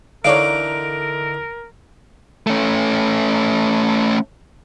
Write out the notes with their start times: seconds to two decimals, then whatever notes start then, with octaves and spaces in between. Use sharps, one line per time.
0.24 D3 E3 D#4 A#4 C#5 D5 F5 D7
2.47 A3 C#4